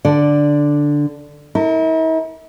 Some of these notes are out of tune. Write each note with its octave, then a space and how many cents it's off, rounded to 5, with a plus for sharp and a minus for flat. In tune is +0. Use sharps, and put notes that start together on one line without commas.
D3 +0 D5 +0
E4 -45 A#4 -25